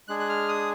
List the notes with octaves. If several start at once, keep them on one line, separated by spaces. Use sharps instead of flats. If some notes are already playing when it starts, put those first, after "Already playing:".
G#3 D4 G#4 F#6
F#6
F6
D#6